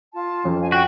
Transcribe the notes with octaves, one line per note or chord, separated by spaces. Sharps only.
F4 A5
F2 C#4
F5 G#5
F#4 G5 C#6